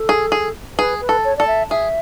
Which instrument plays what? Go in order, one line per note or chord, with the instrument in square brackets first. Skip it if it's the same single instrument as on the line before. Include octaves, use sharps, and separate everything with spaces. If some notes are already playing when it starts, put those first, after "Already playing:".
Already playing: [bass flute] A4
[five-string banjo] G#4
G#4
[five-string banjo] G#4 [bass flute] B4
[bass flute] B4
[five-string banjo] A4
[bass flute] C#5
[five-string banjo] A4 [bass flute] D5
[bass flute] E5
[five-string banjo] G#4 [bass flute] E5